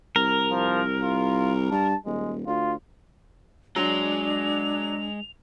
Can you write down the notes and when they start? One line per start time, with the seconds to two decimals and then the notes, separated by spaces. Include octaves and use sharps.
0.16 C2 A#4
0.51 F3
1.03 F4
1.71 G2 A5
2.06 D#1 G#3
2.47 D2 F4
3.76 F#3 G#3 D4 C6 F7